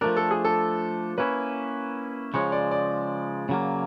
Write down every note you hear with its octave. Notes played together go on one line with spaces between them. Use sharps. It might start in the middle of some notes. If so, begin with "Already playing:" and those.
F3 A3 D4 A#4
A4
G#4
A4
A#3 C#4 E4 B4
C#3 F3 G#3 C#5
D5
D5
C#3 F#3 A#3